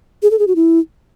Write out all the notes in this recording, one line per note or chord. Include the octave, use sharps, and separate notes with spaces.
G#4
A4
G#4
F#4
E4